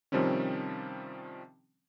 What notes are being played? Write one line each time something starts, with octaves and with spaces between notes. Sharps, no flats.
C3 D#3 F3 G3 C4 C#4